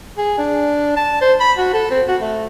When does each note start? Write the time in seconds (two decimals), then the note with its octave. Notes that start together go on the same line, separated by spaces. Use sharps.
0.18 G#4
0.38 D4
0.97 A5
1.21 C5
1.40 B5
1.57 F#4
1.74 A4
1.91 C4
2.08 F#4
2.22 A3